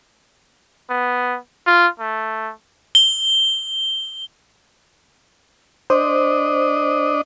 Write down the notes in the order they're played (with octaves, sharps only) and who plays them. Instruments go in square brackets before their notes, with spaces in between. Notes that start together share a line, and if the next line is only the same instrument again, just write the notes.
[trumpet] B3
F4
A3
[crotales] G7
[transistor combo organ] D4 D#5 [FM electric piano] C5